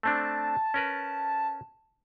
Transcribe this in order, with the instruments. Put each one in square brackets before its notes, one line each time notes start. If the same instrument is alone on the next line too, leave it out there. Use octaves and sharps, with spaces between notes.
[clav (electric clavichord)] A3 C4 D4 [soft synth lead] A5
[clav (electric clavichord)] C#4 A#4 B4